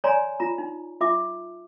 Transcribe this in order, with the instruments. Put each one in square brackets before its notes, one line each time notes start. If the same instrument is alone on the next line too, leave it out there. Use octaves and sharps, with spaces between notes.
[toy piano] C#5 D5 G#5 A#5 C6
F4 A#5
D#4
F4 E5 D6